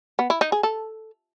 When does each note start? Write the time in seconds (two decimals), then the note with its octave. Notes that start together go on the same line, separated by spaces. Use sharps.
0.19 B3
0.30 E4
0.41 D#4
0.52 G#4
0.63 A4